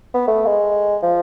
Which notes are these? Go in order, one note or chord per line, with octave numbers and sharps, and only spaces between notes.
B3
A3
G#3
F3